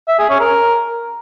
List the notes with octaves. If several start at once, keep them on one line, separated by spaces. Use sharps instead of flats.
E5
G#4
C#4
A#4